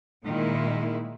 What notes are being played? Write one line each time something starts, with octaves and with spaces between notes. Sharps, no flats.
A#2 D#3 G#3 E4